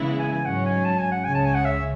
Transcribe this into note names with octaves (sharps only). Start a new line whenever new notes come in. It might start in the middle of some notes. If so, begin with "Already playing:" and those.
Already playing: C#3 E3 G#3 B3 E4
G#5
G#5
G#2 F#3 C#4 F#5
G#5
A5
G#5
F#5
C#2 C#3 G#3 C#4 G#5
A5
G#5
F#5
E5